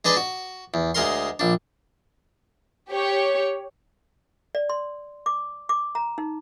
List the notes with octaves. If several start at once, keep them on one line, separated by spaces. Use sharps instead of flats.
G#3 D4 B4 D5 D#5
F#4
E2
D2 G#3 A#4 C6
A#1 D4
G4 C#5
D5
C6
D6
D6
A#5
D#4